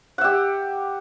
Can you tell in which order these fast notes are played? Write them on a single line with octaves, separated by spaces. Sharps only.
F#5 E5 G4